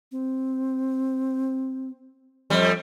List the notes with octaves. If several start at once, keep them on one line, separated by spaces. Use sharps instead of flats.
C4
F2 G3